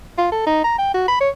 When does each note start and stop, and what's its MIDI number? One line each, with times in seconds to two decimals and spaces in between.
0.18 0.27 65
0.32 0.43 69
0.46 0.64 63
0.64 0.76 82
0.79 0.90 79
0.94 1.07 66
1.08 1.18 83
1.21 1.29 73